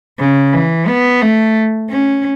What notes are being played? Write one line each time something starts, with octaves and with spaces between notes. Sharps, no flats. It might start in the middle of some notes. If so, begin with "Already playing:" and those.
C#3
E3
B3
A3
C#4